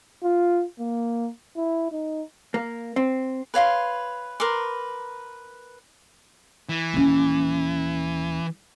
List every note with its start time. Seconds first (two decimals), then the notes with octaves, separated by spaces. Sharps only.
0.24 F4
0.79 A#3
1.56 E4
1.92 D#4
2.54 A#3
2.96 C4
3.54 B4 C#5 F5 C6
4.40 A#4 B4 C6 D6
6.69 E3
6.94 D#1 C#4